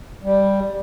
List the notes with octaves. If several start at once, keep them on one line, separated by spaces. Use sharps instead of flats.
G3